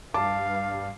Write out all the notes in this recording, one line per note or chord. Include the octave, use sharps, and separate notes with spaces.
G2 F5 A5 D6